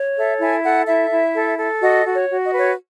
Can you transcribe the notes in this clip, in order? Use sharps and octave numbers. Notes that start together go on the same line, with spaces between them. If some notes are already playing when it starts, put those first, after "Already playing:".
Already playing: C#5
A4 E5
E4 G#5
A4 F#5
E4 E5
E4
A4
A4
F#4 D#5
F#4
C#5
F#4
D#5
B4 C#5